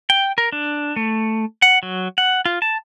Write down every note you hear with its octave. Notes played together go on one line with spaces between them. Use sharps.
G5
A#4
D4
A3
F#5
F#3
F#5
F4
A5